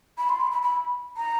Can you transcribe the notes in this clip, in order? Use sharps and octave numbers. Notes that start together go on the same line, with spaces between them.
B5
C6
B5
B5
B5
A#5